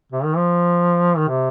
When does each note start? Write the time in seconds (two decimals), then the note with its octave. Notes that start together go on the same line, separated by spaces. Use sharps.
0.12 C3
0.24 D#3
0.36 F3
1.17 D#3
1.28 C3